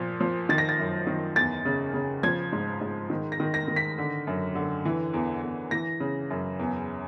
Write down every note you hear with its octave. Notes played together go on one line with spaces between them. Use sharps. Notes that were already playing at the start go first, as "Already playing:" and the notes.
Already playing: A#2 F3
F3
D#3 A6
A#6
A6
F#2
D#3
E2 A6
C#3
C#3
F3 G#6
G#2
G#2
D#3
A#6
D#3
A#6
D#3
B6
D3
F#2
D3
E3
E2
E2
E3 A#6
C#3
F#2
E2